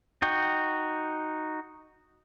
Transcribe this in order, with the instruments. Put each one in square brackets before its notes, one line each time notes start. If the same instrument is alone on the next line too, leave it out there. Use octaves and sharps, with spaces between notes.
[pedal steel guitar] D#4 F#4 G5